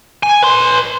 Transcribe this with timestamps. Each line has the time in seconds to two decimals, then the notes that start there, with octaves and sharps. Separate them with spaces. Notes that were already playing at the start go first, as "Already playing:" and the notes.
0.23 G#5
0.43 B4 C6